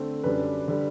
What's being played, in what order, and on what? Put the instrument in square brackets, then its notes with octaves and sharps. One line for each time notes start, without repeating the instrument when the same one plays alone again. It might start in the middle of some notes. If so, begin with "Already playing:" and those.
Already playing: [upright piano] D3 A3 C4
F#2 D3 G3 D4 B4
D3 G3